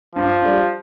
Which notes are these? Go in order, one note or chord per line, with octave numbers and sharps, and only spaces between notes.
G2 F3
G3 D4